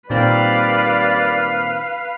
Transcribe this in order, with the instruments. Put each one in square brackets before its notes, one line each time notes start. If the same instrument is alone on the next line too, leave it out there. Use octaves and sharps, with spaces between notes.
[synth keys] A#2 D#3 C4 [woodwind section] G3 D5 [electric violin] B4 F5